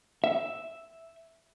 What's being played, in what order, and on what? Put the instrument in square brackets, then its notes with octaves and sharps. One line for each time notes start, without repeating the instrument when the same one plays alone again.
[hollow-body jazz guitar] E5